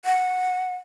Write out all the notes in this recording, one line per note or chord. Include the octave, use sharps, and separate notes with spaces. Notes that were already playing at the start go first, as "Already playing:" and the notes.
F#5